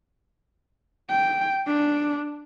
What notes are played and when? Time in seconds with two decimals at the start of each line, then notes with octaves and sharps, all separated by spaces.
1.10 G5
1.67 D4